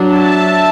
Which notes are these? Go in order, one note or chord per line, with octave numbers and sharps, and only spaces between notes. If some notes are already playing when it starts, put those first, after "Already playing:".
Already playing: F#3 D4
E5 A5